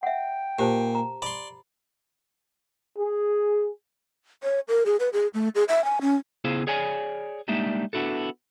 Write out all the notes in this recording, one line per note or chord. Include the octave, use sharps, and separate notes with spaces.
E5 F#5 G5
A#2 G4 C5 A5
A#5
D5 B5 C6
G#4
C#5
A#4
G#4
B4
G#4
A3
G#4
E5
G#5
C#4
C#3 B3 E4 F4 G#4 C5
G#4 C#5 D5 G#5
G3 G#3 A#3 D4 D#4 E5
B3 D4 E4 F#4 A4